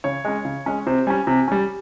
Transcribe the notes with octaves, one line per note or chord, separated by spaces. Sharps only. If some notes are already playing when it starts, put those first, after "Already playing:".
C#3 C#5
G#3 C#4
C#3
G#3 C#4
C3 C5
G3 C#4 G#5
C3
G3 C#4